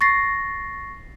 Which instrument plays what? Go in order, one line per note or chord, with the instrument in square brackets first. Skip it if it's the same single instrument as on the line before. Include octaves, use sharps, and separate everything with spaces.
[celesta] C#6 A6 A#6 C7